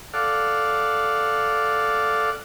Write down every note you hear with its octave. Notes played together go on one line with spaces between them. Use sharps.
A4 D5 F5 F#5